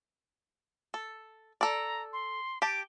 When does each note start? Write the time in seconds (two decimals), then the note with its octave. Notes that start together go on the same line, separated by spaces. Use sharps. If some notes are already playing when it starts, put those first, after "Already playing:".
0.94 A4
1.61 A4 D5 A#5
2.12 C6
2.62 G4 A5 D7